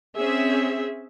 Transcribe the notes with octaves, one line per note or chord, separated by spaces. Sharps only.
C4 C#4 G#4 E5